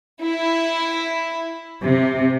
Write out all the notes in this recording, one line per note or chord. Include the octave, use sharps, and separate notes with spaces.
E4
C3